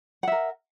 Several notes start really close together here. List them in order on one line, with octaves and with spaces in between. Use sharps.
F#5 E5 A#4